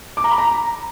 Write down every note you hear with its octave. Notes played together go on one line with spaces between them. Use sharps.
D6
A#5
B5
A#5